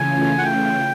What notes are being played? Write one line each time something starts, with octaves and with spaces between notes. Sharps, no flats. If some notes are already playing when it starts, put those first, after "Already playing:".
Already playing: C#3 E3 A3 C#4 F4 G#5
F#5
G5